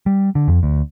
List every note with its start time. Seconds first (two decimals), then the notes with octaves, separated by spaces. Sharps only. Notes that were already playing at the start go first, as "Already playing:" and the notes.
0.06 G3
0.35 D3
0.48 F2
0.63 D2